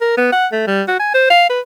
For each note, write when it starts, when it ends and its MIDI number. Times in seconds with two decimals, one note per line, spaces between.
0.01 0.14 70
0.18 0.28 59
0.33 0.47 78
0.52 0.65 57
0.67 0.82 55
0.88 0.98 66
1.00 1.11 80
1.14 1.26 72
1.30 1.48 77
1.50 1.60 71